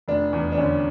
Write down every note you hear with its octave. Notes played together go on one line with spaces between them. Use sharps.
F1 D4
E2
D4
D3 C#4